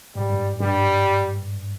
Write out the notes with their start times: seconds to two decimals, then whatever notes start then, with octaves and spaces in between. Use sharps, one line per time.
0.15 G#2 G3
0.30 G2
0.60 G2 G3